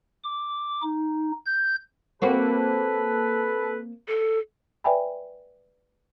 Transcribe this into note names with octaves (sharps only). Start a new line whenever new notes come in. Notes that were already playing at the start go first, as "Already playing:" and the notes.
D6
D#4
G6
A#3 C4 F#4 A4 B4
A4
B4 D5 E5 G5 G#5 B5